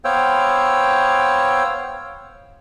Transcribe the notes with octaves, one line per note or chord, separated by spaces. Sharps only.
B3 C5 C#5 F5 G5 E6